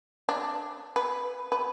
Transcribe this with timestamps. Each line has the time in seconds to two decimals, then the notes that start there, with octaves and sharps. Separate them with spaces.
0.29 D4
0.96 B4
1.52 B4